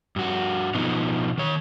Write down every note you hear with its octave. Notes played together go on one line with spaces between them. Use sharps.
G2 F#4
B2 F3 B3 D#4
D#3 C#5